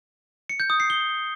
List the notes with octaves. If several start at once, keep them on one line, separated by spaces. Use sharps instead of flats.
C#7
G6
D#6
C7
G7